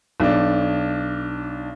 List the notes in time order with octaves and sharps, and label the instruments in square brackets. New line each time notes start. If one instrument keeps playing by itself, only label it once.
[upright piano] B1 D4